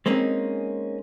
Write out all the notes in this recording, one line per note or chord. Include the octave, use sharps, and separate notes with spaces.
G#3 A#3 C4 C#4 D#4